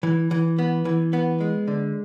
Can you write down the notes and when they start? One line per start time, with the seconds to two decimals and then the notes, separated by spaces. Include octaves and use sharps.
0.03 E3
0.31 E3
0.58 B3
0.85 E3
1.13 B3
1.40 G#3
1.68 D3